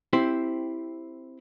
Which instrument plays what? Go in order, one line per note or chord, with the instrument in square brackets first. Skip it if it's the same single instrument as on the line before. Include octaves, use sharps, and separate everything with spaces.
[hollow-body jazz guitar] C4 E4 G4 C5